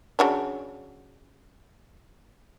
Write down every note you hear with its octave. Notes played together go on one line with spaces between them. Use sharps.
C#3 F#3 D4